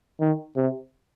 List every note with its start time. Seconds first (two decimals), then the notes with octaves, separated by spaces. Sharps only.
0.20 D#3
0.56 C3